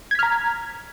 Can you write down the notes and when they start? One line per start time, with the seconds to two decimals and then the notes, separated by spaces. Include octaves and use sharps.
0.11 G#6
0.15 B6
0.19 F6
0.23 A#5